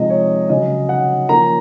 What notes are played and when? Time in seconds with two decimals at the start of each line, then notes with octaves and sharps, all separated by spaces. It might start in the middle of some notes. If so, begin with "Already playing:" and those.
Already playing: C3 F3 G#3 D#4 D#5
0.10 C#5
0.49 C#3 F#3 C#4 D#5
0.89 F#5
1.29 F3 A#3 C#4 A#5